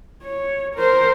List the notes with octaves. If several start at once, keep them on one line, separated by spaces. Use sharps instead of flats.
C#5
A#4 C5